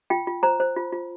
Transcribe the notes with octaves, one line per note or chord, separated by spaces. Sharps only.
F4 G5
F4
C5 A#5
C5
F4
F4